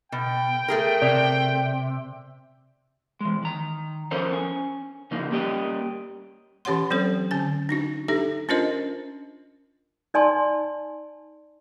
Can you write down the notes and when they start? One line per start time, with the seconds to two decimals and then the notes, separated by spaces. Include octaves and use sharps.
0.12 B2 G5
0.68 A3 G#4 A#4
1.02 C3 D5
3.21 E3 G#3
3.43 D#3 A#5
4.11 F3 C#4 A4 A#4 C5 C#5
4.32 C#4 G#5
5.11 C#3 F3 A#3 D#4
5.31 G3 A#3 C#4 G4 D#5
6.65 E3 C#4 G4 C#5 F#5 C6
6.90 F#3 C4 A4 C5
7.31 D3 C#4 G#5
7.69 D4 D#4 F#4
8.08 D4 D#4 G4 A4 E5
8.49 C#4 D4 F4 A#4 C5 D#5
10.14 D#4 D5 G#5 A5 C6